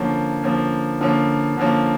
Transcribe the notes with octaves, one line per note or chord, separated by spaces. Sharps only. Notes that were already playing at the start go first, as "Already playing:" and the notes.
Already playing: D3 F3 A#3 C#4
D3 F3 A#3 C#4
D3 F3 A#3 C#4
D3 F3 A#3 C#4